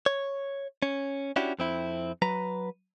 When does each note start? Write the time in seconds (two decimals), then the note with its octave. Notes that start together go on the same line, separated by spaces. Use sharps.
0.06 C#5
0.82 C#4
1.36 C#4 D4 E4 F#4 G4
1.59 F2 C4 E4
2.22 F#3 B4 A#5